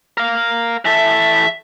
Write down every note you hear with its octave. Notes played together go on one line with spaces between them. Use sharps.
A#4 F5
E3 A4 E5